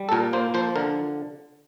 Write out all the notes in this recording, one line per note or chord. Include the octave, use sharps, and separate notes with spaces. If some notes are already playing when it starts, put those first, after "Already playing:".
Already playing: G3
A4
A#2 A#4
A#3 C5
F3 C5
D3 A#4